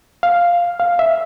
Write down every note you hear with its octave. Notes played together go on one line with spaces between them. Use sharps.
F5
F5
E5